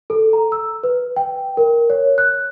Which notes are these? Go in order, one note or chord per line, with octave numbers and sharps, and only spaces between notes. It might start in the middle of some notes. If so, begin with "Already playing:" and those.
A4
A#5
E6
B4
G5
A#4
C#5
F#6